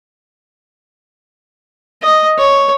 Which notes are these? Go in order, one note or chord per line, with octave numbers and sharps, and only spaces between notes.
D#5
C#5